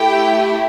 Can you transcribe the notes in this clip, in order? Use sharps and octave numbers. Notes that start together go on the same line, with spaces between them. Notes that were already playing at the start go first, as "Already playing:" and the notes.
Already playing: A3 E4 G4 G5